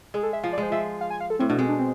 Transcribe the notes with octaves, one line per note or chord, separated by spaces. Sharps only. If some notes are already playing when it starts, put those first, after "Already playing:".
G#3 G#4
A4
E5
F3 F5
D5
G#3
C5
F3 E5
F5
G#5
F5
A4
A2 C4
B2 D4
G#3 C4
D4
C4